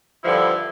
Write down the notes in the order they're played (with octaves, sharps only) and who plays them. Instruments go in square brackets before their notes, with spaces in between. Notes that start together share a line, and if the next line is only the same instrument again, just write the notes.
[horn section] G2 D3 F3 E4